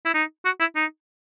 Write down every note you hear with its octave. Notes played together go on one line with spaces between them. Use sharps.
E4
D#4
F#4
E4
D#4